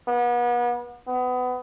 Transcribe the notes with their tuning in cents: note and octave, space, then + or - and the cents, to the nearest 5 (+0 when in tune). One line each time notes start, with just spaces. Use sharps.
B3 -35
B3 +25